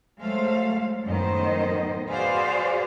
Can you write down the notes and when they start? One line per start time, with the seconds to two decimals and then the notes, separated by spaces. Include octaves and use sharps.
0.18 F#3 G#3 A3 C5 F5
1.05 F#2 A2 D#3 B3 C5 D#5
2.07 F#4 G#4 B4 C5 D5 F5